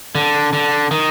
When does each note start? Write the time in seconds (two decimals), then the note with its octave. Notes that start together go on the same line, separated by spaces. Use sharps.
0.15 D3
0.53 D3
0.91 D#3